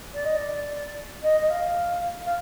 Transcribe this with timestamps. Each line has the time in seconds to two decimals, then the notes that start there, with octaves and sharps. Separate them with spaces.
0.13 D5
0.24 D#5
0.35 D5
1.22 D#5
1.40 D#5
1.50 F5
2.25 F5